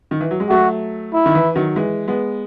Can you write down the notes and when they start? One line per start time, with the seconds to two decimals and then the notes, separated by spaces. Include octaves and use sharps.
0.11 D#3
0.21 E3
0.31 F#3
0.40 G#3
0.49 F#3 A3 F#4
1.14 E4
1.26 D#3
1.35 E3
1.55 D#3 F#3
1.76 E3 G#3
2.08 G#3 B3